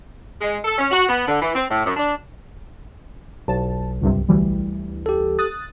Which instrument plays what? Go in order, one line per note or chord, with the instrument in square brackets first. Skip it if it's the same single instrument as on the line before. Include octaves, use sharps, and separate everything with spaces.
[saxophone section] G#3
A4
C#4
F#4
B3
D3
E3
C4
A2
F#2
D4
[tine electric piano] B1 [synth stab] A5
[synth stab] C#2 G2 C3
D2 E3 G3
[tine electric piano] G4 A4
[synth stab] D#6 F#6 A6